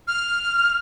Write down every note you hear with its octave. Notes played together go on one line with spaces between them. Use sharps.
F6